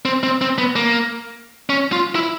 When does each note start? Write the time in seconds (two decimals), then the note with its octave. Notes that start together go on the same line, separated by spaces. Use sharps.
0.05 C4
0.23 C4
0.41 C4
0.58 B3
0.76 A#3
1.70 C#4
1.92 F4
2.15 E4